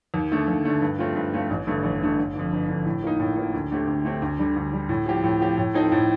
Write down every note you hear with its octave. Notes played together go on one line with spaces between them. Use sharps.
D#2
D3 A3
D#2
D3 A3
G2
F3 A3 C4 F4
G2
F3 A3 C4 F4
A1
G2 D3 A3
A1
G2 D3 A3
G1
F2 D3
G1
F2 D3
A2
F3 A#3 D#4
A2
F3 A#3 D#4
D2
D3 A3 C4 G4
D2
D3 A3 C4 G4
D2
D3 G3
D2
D3 G3
A2
F3 C4 G4
A2
F3 C4 G4
A2
F3 C4 D#4 A4
A2